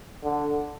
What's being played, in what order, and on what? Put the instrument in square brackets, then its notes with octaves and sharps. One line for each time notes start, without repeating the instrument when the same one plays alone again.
[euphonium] D3